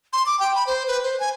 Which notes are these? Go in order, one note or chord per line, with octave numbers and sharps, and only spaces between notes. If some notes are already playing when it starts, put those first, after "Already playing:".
C6
D6
G5
B5
C5
B4
C5
G#5